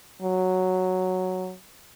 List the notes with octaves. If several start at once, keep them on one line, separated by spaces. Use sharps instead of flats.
F#3